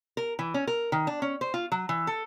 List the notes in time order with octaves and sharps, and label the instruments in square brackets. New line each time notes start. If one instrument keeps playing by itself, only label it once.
[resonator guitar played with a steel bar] A#4
E3
C#4
A#4
D#3
D4
C#4
C5
F4
F#3
E3
A4